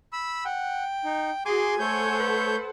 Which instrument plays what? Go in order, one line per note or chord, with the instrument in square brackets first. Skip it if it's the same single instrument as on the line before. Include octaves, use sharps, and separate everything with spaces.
[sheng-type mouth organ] B5 E6
[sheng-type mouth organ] F#5 [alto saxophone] G5
[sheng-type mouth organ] D#4
[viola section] F#4 G#4 [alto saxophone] G#5 [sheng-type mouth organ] C6 D6
[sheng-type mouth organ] A3 C#5 G6 [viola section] A4 C5 F#5
[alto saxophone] B4